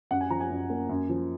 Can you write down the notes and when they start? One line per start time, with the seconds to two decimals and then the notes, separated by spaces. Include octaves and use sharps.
0.11 F#2 F#5
0.21 G#5
0.30 F3 A#5
0.41 G#5
0.50 F#2
0.70 A#3
0.89 F#2
1.09 F3